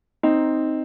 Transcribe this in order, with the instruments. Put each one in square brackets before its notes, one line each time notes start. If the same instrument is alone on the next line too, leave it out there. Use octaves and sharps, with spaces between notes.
[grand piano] C4 [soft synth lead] D#4